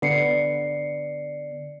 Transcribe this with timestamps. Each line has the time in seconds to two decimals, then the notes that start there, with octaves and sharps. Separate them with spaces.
0.02 D3 B3 D5 C7 C#7